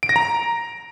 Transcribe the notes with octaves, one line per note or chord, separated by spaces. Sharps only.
D7
A#6
A#5